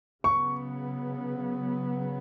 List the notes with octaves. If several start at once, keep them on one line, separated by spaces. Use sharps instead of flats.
C#3 F#3 B3 C#6